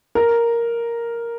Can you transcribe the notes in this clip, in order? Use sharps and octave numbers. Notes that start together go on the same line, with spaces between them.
A#4